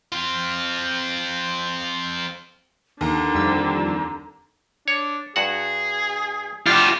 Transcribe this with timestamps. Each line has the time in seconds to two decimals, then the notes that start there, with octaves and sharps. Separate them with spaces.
0.13 C4 F4
3.01 D#2 D3 A#5
3.34 F2 G3 E6
4.88 D4 C#5
5.36 G2 F#4 G#4 F#5
6.67 G3 D4 F4 G4